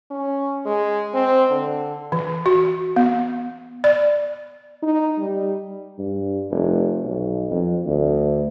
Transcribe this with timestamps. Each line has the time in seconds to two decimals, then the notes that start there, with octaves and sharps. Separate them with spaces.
0.11 C#4
0.66 G#3
1.14 C4
1.50 D3
2.12 E3
2.46 F#4
2.96 B3
3.84 D5
4.82 D#4
5.19 G3
5.98 G2
6.51 F1
7.04 B1
7.50 F2
7.86 D2